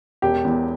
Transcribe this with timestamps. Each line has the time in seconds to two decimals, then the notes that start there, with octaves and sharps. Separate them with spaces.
0.22 E1 G4
0.45 E2